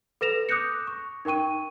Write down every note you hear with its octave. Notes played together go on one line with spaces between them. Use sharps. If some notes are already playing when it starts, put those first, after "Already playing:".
A4 B4 A#6 E7 F7
D6 D#6 F#6 G6 A#6 C#7
C#6
D#4 A#4 G5 C#6 D#7